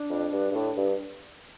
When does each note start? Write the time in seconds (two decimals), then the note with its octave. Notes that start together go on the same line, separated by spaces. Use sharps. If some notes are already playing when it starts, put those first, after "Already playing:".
Already playing: D4
0.10 F2
0.33 G2
0.51 G2
0.55 A2
0.78 G2